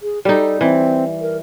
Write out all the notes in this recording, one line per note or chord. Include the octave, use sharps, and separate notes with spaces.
G#4
G3 D#4 A4
E3 C4
A#4